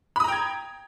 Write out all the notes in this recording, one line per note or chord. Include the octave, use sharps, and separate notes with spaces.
G5 A#5 B5 D#6 G#6